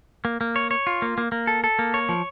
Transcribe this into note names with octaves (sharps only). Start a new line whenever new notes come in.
A#3
A#3
C#5
C#5
F4
A#3
A#3
A#3
A4
A4
A#3
C#5
F3